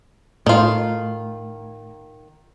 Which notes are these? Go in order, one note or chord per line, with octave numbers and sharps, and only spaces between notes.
A2 D#3 F4